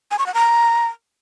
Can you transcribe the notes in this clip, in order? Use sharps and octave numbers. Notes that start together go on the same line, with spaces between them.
G#5
C#6
F#5
A#5